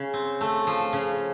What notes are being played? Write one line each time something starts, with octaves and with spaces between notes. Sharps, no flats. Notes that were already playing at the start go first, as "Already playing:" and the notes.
Already playing: C#3
C4
A3
F3
C#3